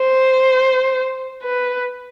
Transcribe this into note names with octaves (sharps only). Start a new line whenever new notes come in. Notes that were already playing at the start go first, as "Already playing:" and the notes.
Already playing: C5
B4